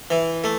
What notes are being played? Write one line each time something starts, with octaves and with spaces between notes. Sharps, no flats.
E3
A3